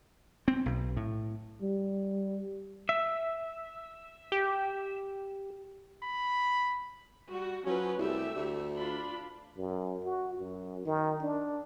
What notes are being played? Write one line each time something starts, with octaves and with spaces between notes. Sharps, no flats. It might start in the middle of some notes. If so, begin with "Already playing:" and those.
C4
B1
A2
G3
E5
G4
B5
G3 F#4
F3 F#3 C#4 B4
C2 A3 G4 E5
D2
D4 F4 B5
F#2
F#4
F#2
D#3
D4